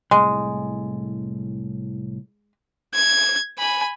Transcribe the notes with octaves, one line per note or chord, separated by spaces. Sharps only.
C2 A2 G#3
G#6
G#5 B5